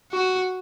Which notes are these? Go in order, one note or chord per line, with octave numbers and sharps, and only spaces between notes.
F#4